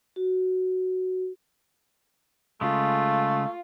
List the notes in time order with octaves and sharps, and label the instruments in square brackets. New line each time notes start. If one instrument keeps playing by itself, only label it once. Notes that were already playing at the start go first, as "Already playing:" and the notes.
[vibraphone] F#4
[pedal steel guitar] C#3 G#3 [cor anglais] A3 [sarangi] F4